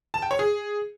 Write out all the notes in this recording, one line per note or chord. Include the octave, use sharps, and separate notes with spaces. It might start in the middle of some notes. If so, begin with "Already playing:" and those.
A5
G5
C#5
G#4